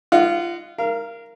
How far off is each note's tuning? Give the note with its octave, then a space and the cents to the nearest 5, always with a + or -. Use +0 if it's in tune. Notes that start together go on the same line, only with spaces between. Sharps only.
F4 -25 D#5 -15 F#5 +5
A#4 +0 F5 -30